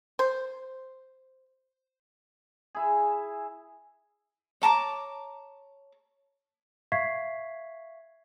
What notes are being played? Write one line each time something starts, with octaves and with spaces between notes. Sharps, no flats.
C5
E4 G#4
C#5 A5 A#5 D6
E5 F5 C#6 G#6 B6 C7